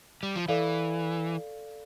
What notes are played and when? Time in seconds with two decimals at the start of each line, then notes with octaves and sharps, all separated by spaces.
0.23 G3
0.36 F3
0.48 E3 A4 D5 F5